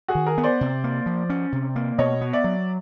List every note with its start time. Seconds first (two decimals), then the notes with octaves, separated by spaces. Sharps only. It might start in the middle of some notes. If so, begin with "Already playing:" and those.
0.08 F#4 G#4
0.15 D#3
0.26 G#4 A#4
0.38 B3
0.43 C5 D5
0.61 C3
0.84 A#3
1.06 F3
1.30 C#4
1.52 C3
1.76 A#3
1.98 B2 C#5 D#5
2.21 B3
2.33 D5 E5
2.44 F#3